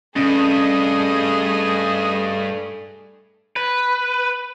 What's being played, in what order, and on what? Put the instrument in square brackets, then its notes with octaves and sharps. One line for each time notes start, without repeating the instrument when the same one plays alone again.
[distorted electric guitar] G2 [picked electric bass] C3 C#4 [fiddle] A3 G#4 [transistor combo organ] D#5
[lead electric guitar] B4